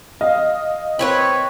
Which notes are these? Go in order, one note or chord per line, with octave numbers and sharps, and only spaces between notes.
D#5 F5
C4 B4 C#5 B5